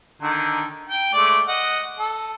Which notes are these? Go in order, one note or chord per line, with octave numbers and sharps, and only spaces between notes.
D3 D#3
G5
G#3 A3 D5
D#5 F#5
A4